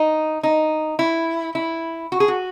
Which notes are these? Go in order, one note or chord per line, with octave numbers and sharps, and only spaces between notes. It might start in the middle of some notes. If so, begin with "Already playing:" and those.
Already playing: D#4
D#4
E4
E4
F#4
G#4
F#4